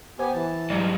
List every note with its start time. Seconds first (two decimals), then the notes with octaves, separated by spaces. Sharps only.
0.19 B3 G4 C5 G#5
0.34 E3 A5
0.70 G#2 F#3 G3